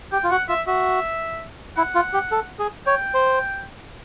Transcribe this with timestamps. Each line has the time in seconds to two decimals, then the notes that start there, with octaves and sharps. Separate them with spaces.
0.12 G4 G5
0.24 F4
0.30 F#4 F#5
0.49 F4 E5
0.67 F#4 E5
1.77 E4 F#5
1.95 F4
2.13 G4
2.32 A4
2.59 G#4
2.87 C#5 G5
3.14 C5